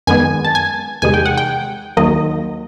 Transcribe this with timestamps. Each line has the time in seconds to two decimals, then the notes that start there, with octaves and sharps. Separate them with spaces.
0.07 F#2 D#3 G#3 B3 G#5
0.45 A5
0.55 G#5
1.02 E2 C3 D#3 G#3 G#5
1.14 G5
1.26 F#5
1.37 G5
1.97 D#2 D#3 F#3 A#3 D#5